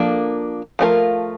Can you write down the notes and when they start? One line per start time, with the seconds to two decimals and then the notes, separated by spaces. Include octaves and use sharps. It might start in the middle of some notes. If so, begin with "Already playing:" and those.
Already playing: F3 A#3 D4 A4
0.79 F3 A3 D4 F4 A#4